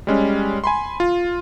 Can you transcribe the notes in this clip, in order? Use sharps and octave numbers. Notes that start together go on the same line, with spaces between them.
G3 G#3 C#4
G#5 B5 C6
F4